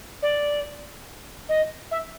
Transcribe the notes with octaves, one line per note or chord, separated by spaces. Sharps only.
D5
D#5
E5